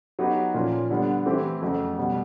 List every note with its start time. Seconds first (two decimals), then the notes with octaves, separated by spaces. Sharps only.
0.19 F#3 B3 D#4 G4 B4
0.54 A#2 F3 A#3 C#4
0.90 D3 G3 B3
1.26 E3 A3 C4 E4 G4
1.62 F2 C#3 F#3 A3
1.98 B2 G3 B3